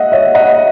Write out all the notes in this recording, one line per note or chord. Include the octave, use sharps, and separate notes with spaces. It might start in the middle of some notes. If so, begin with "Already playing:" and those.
Already playing: D#5 E5 F#5
C#5 E5
D#5 F#5